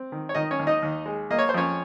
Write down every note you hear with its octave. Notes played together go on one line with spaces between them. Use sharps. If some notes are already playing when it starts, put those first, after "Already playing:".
Already playing: C4
D#3
C#5
D#3 D#4 D#5
C#4 C#5
D#2
D#4 D#5
D#2
G#3
A#3 D#5
C#5
C5
F2 C#4 C#5